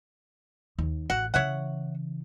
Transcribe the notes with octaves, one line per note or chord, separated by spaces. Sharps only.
D#2
A1 F#4 F#5
C#3 E3 C#5 E5 F#5